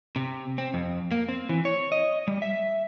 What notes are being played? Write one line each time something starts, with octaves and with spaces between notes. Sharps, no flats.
C3
C4
F2
A#3
C4
E3
C#5
D#5
G3
E5